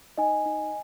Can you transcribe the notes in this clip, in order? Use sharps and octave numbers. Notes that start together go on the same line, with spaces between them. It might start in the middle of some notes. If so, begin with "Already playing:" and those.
D#4 D#5 G#5
D#4